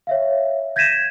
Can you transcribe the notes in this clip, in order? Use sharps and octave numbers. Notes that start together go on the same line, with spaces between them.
C#5 E5 F5
G6 G#6 A#6 B6 D#7 E7